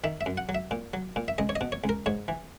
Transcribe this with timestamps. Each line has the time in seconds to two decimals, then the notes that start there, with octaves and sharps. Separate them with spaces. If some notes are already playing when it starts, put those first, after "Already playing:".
0.04 D#3 E5
0.21 E5
0.26 F#2
0.37 F#5
0.49 F#3
0.55 E5
0.71 A#2
0.94 F#3
1.16 A#2
1.28 E5
1.38 C#2 D#5
1.49 C#5
1.56 D#5
1.61 B2
1.72 C#5
1.84 C#2
1.89 A#4
2.06 G#2 C#5
2.28 E3